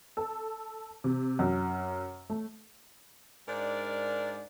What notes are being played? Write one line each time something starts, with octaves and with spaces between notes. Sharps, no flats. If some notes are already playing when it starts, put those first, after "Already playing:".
A4
C3
F#2
A3
G#2 D4 A#4 D5